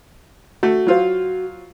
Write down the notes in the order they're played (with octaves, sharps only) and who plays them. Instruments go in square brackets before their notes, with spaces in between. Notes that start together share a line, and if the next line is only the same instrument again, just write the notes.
[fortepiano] A3 [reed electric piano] F#4
[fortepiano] F#3 F4 C5